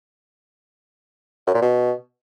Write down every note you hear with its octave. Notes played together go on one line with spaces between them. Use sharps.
F#2
A#2
B2